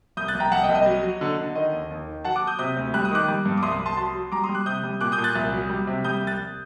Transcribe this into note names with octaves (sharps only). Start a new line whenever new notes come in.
C2 D#6 G6
F#6 A6
C2
G5 A#5
C2 F#5 A5
D#5 G5
C2
D#5
F#3
F#3
D3
D3
D#3 D#5
D#2
D#2
D#3
F#3 F#5 A5
D6 F#6
F#3
D#6 G6
C3 D#6 G6
D2
G3 F#6
D#6
D#3 D6 F#6
G3
G2
D6
C2 C6 D#6
C2
A5 C6
F#3 A5 C6
F#3
G3 A#5 D6
C6 D#6
G3
D6 F#6
C3 D#6 G6
G3
A#2 D6 F#6
D#6 G6
A#2
F#6 A6
C2
F#3
G3
C3
G3 D#6 G6
C2
F#6 A6
C2